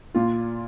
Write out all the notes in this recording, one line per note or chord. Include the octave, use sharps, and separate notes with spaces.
A#2 F4